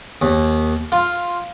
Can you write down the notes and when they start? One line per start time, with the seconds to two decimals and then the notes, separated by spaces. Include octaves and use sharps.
0.22 D#2
0.92 F4